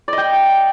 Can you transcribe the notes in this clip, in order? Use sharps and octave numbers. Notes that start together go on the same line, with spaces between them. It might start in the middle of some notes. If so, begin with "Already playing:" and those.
D5 D#5 G5